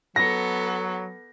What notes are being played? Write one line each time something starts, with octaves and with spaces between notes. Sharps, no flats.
F#3 B3 A4 A#6